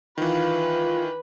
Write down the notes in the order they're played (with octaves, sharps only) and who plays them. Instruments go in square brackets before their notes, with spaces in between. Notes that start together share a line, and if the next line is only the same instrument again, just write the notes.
[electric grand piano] D#3 E3 [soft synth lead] F4 [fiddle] B4